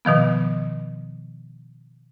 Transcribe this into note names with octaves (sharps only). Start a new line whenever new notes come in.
B2 D#3 F3 B3